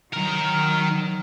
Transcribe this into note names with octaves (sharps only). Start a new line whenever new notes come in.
D#3 F#3 A#4